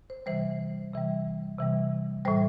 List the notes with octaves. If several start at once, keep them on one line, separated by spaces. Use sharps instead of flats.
C5
C3 E3 G3 C5
C3 E3 G3
C3 E3 G3
A2 E3 G3 C5